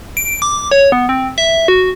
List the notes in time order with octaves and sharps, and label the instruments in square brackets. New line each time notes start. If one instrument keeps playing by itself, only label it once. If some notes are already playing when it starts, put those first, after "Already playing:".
[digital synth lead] D7
D6
C#5
B3
C4
E5
F#4